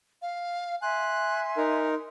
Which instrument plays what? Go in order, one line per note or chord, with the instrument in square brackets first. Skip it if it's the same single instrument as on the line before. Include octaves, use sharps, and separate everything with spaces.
[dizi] F5
[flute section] E5 G#5 [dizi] C6 [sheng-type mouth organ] F#6
[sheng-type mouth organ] D#4 A#4